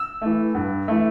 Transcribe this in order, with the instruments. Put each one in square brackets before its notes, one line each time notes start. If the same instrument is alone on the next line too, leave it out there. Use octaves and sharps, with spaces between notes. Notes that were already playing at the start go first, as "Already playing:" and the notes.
Already playing: [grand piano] E6
E3 A3
G2
E3 A3